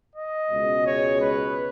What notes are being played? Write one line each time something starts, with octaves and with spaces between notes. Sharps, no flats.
D#5
C#2 B2 G#3
C#5
B4